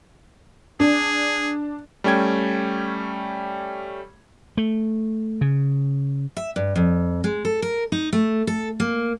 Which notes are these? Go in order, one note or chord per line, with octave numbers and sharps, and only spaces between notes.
D4 G#4
G3 A3 C#4 G5 G#6
A3
C#3
E5
G2
F2
G#3
A4
A#4
D#4
A3
A4
A#3